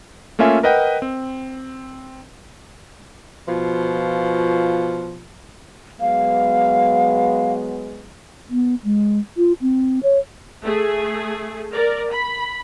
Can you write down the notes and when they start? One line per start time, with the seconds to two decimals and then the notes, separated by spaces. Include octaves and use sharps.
0.39 A3 A#3 C#4 F4 E5 G#5
0.63 A#4 B4 D#5 F#5 G5
1.02 C4
3.47 B2 F3 F4
6.01 F#3 G#3 B3 F5
8.50 B3
8.84 G#3
9.37 F4
9.61 C4
10.03 C#5
10.63 A3 G#4
11.72 A#4 D5
12.11 B5